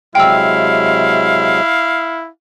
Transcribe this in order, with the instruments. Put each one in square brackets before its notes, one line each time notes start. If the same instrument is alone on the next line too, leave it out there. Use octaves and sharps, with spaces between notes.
[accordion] C3 F#3 G#3 [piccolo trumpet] E4 [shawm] F5 [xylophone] G5 E6